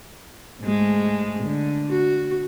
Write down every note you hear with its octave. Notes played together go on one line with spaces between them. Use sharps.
G#2 G#3 A3
D3
F#4